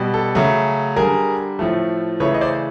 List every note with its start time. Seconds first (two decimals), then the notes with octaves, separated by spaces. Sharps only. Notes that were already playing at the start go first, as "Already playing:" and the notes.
Already playing: B2 G3
0.14 A4
0.35 C#3 F#3 A3
0.96 D3 G3 G#4 A#4
1.59 A2 F3 A3
2.20 C#3 E3 A3 B4 C#5
2.34 D#5
2.41 C5 D5